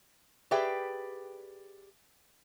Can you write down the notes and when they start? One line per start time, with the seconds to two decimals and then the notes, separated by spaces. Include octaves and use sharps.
0.51 G4 G#4 B4 D5 E5 G5